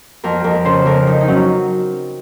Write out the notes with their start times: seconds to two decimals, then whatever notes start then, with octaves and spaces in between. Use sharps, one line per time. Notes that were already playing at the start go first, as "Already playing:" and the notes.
0.24 F2 A#4
0.44 F2 A#4
0.65 C#3 C5
0.86 F2 A#4
1.07 F2 D#4
1.21 D#4
1.28 F#3 C#4